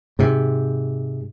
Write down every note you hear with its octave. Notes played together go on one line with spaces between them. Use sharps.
G#2 C3